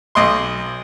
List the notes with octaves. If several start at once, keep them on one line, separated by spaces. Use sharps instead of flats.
B1 D#5 C6